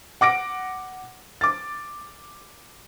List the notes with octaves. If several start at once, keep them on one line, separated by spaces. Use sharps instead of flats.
F#5 D6 A#6 D7
D6 A6